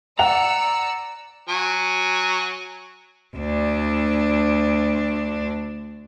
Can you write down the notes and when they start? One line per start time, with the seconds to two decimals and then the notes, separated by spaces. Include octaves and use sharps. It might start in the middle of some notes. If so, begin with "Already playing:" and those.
0.19 D5 F#5 A#5 E6 C#7 F7
1.49 F#3 G#5
3.36 D2 D4